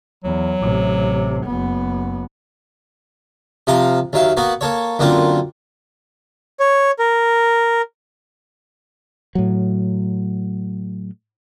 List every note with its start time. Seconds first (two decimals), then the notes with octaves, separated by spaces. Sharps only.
0.24 E2 F#3
0.62 A1 C3
1.45 F#1 B3
3.67 C3 F3 F5 A#5
4.13 D#2 F#3 E5 F5
4.37 A#3 B3 F#4
4.61 A#3 A4 C#5
4.99 F#2 D3 A#3 C4 F4
6.60 C#5
6.99 A#4
9.35 A2 F#3